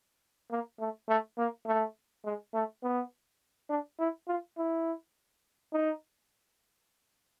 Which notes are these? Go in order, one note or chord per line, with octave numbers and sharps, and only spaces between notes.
A#3
A3
A3
A#3
A3
G#3
A3
B3
D4
E4
F4
E4
D#4